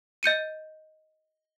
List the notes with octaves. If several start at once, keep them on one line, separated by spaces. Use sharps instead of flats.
D#5 G6 C#7 D#7